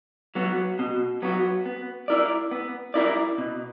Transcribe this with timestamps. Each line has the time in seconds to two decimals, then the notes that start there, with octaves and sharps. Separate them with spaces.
0.35 F#3 B3 F#4
0.79 B2
1.22 F#3 B3 F#4
1.66 B3
2.08 E4 A#4 D5
2.51 B3
2.94 E4 A#4 D5
3.38 B2